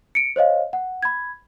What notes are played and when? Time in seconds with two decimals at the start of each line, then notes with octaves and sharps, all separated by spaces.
0.15 C#7 D7
0.36 C5 C#5 D#5 F5
0.73 F#5
1.03 B5 G#6